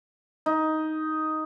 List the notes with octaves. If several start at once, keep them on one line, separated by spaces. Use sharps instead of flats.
D#4